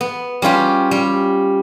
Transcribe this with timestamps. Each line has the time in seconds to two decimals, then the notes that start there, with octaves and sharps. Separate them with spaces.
0.01 B3
0.42 G3 C#4 F4 G4
0.91 G3